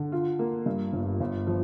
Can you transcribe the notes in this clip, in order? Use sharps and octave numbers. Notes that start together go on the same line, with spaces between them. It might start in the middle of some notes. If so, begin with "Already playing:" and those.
Already playing: D3
F4
A#3
G2
G1
G1
F3